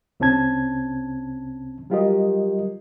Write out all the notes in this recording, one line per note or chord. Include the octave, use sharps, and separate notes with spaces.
C2 C3 C4 C#4 A5 G#6
F#3 G3 F4 G4 A#4 D#5